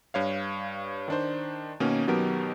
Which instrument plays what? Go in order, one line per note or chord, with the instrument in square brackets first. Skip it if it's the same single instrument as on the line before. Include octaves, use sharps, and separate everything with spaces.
[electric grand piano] G2 C#5 F5
D#3 D4 C5
B2 D#3 A#3 C#4
B2 D#3 F#3 B3 G4 A#4